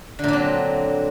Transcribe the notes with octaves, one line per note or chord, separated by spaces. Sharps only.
A#2 D3 F#3 C4